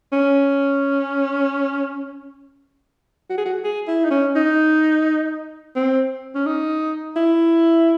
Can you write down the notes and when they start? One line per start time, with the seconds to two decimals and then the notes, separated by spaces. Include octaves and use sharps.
0.12 C#4
3.30 F#4
3.38 G#4
3.46 F#4
3.64 G#4
3.88 E4
4.04 D#4
4.11 C#4
4.36 D#4
5.76 C4
6.35 C#4
6.46 D#4
7.16 E4